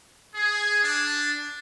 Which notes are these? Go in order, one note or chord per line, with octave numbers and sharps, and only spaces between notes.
G#4
D4